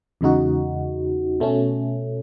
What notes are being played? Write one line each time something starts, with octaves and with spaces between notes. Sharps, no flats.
E2 C#3 G#3 D#4 F#4
B2 A3 C#4